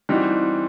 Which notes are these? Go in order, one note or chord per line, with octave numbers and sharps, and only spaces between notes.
E3 G3 C4 D#4 F#4